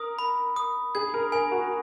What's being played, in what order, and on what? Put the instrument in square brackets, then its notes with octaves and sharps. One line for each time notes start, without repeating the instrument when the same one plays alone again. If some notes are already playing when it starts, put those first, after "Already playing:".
Already playing: [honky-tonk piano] A#4 [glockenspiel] D#6
[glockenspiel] B5
D#6
[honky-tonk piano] G#4 [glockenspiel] G#6
[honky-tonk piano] A#4
[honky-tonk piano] A#4 [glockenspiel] G#5
[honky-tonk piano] F#4